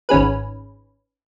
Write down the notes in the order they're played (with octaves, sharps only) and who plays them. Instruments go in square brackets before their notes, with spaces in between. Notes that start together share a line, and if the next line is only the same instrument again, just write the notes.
[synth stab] G#1 C#4 G#4 B4